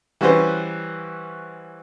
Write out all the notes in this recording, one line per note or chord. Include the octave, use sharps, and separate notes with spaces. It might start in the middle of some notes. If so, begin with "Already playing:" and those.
E3 G3 C#4 F#4 B4 C5